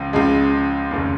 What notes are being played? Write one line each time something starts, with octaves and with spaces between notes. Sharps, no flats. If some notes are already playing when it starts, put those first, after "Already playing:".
Already playing: C#2 C#3 F3
C#2 C#3 F3 G#3
F1 D#2 C#3